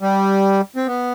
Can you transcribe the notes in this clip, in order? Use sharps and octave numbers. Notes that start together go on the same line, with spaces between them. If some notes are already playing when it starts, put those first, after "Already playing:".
G3
C4
B3